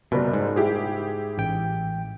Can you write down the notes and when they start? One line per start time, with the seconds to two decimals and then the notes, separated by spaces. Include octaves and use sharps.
0.12 F#1 B2 G3
0.33 G#2
0.56 E4 G4 G#4
1.38 A1 G5